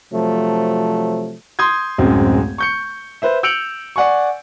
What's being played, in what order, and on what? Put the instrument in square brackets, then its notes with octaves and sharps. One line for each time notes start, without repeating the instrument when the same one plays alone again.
[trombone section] C3 F3 F#3 A3
[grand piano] C6 D#6 G6 G#6
D1 F#2 G#3 C4
C#6 G6 C#7
B4 C5 E5
E6 G6 C#7 D7 F7 F#7
D5 F#5 G#5 C#6